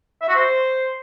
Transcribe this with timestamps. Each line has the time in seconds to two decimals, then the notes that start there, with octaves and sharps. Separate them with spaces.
0.22 E5
0.29 F#4
0.35 C5